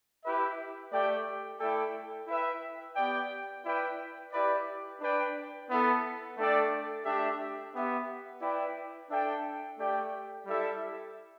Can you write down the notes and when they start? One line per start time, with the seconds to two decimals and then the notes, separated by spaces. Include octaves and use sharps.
0.24 E4 G4 B4 E5
0.91 A3 G4 D5 G5
1.60 A3 E4 A4 D5 G5
2.28 E4 B4 E5 G5
2.96 B3 G4 D5 G5
3.64 E4 B4 D5 G5
4.33 E4 G4 B4 D5
5.00 D4 B4 D5 G5
5.69 B3 E4 A4
6.37 A3 D4 A4 D5 G5
7.05 A3 D4 G4 E5
7.74 B3 G4 E5
8.41 E4 B4 D5 G5
9.10 D4 A4 E5 G5
9.78 A3 G4 D5 G5
10.46 G3 E4 A4 E5